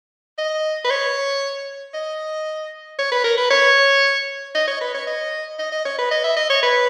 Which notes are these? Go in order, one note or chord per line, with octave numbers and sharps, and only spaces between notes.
D#5
B4
C#5
D#5
C#5
B4
A#4
B4
C#5
D#5
C#5
B4
C#5
D#5
D#5
D#5
C#5
B4
D#5
E5
D#5
C#5
B4